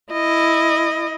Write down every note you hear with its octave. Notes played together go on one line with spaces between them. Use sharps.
E4 D#5